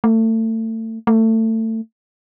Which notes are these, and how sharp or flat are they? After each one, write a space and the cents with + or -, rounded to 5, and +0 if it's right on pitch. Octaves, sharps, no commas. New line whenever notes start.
A3 +30
A3 +25